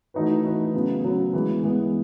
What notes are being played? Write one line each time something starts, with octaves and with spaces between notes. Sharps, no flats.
E3 A3 D#4 F#4 B4
E3 A3 D#4 F#4 B4
C#3 F#3 B3
C#3 F#3 B3
E3 G#3 B3
E3 G#3 B3